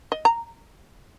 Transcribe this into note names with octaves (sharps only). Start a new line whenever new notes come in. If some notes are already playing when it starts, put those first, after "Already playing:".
D#5
A#5